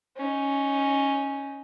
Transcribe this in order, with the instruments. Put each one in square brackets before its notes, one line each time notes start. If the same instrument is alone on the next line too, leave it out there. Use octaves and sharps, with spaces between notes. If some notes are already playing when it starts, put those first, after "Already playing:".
[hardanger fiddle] C#4 D#4